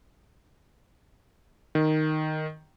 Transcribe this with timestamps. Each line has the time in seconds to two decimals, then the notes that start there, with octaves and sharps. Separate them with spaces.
1.75 D#3